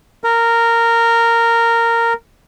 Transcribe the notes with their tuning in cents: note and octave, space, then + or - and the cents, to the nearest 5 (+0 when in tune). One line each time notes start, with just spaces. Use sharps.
A#4 -10